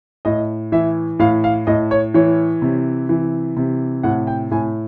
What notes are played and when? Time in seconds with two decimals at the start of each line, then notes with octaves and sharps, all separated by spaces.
0.25 A2 D#5
0.72 E3 E5
1.19 A2 F5
1.44 F5
1.67 A2 D#5
1.91 C#5
2.14 E3 C#5
2.62 C3
3.09 E3
3.57 C3
4.03 A2 F#5
4.27 G5
4.51 A2 G#5